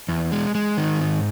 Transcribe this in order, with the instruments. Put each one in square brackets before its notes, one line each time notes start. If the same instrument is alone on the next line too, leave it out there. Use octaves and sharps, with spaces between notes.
[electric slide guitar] E2
G#3
G#3
D#3
G#2